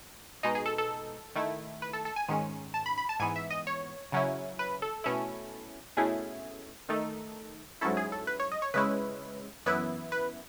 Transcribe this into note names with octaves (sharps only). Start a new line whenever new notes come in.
B2 G#3 D#4 D#5
G#4
A4
A4
D#3 A3 E4
B4
A4
A4
G#5
G#2 D#3 G#3 C#4
A5
B5
B5
A5
G#2 E3 B3 G#5
E5
D#5
C#5
C#3 F#3 C#4 E4
B4
A4
B2 A3 C#4 E4
B2 A3 C#4 E4 G#4
D#3 A3 D#4 A4
G#2 F#3 C#4 E4 A4
G#4
A4
B4
C#5
D#5
C#5
C#3 G#3 C#4 E4 B4
F#2 E3 B3 E4 B4
B4